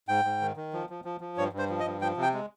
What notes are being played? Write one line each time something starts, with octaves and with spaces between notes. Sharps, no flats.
G#2 G5
G#2
D#3
D#3
F3
F3
F3
F3
G2 C#5
G2
C5
F3
D#5
G2
F3 G5
C3
G5
G#3